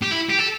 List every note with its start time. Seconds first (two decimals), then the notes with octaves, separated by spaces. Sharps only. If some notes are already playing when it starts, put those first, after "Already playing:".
0.02 G4
0.11 E4
0.29 G4
0.39 A4